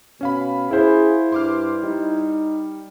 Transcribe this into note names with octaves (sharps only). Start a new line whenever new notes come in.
B2 C#4 F5 B5
E4 G#4 C5
G2 C6 D6 F6
G3 D#4